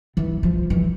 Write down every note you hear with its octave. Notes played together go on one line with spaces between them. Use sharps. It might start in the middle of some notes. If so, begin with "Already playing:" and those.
E3
F3
E3